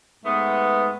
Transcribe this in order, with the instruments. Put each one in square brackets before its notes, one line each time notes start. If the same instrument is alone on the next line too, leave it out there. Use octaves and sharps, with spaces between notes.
[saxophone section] G#2 A3 B3